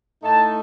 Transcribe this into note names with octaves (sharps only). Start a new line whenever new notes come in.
A2 A3 D#4 A5